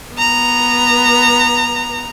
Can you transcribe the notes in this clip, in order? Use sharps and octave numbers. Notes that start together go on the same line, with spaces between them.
B3 A#5